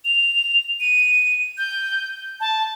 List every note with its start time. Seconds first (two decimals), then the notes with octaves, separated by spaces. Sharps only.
0.05 F7
0.80 D#7
1.58 G6
2.40 A5